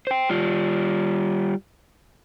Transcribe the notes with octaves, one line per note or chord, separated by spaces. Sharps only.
C5 G5
G3 F4